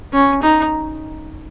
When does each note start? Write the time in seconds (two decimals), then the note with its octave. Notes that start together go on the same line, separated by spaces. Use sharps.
0.13 C#4
0.42 D#4